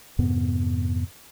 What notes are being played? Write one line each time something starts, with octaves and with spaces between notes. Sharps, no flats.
F2 G#2 C3 B3